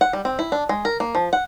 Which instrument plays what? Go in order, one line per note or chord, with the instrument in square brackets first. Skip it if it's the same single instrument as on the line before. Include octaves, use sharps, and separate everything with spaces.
[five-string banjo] F#5
G3
C4
E4
D4
G#3
A#4
A#3
F3
F#5